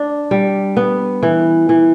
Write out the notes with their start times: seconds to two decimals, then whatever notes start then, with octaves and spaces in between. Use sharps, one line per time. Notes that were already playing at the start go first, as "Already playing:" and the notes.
Already playing: D4
0.31 G3
0.77 B3
1.23 E3
1.69 E3